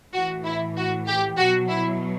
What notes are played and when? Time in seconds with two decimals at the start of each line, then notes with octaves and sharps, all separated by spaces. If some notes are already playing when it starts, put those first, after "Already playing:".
0.13 A2 E3 F#4
0.44 E4
0.76 F#4
1.07 G4
1.38 B2 F#3 F#4
1.69 E4